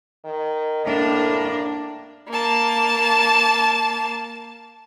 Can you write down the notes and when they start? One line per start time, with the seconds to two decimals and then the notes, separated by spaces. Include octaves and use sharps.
0.25 D#3
0.85 A2 A#3 D4
2.29 A#3 A5